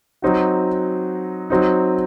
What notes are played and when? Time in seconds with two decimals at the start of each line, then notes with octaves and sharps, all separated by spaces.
0.22 F#3 C4 D#4 F#4
1.50 F#3 C4 D#4